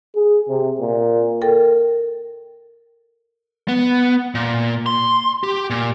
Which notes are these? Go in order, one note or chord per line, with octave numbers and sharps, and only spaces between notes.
G#4
C3
A#2
A4 A#4 G5
B3
A#2
C6
G4
A#2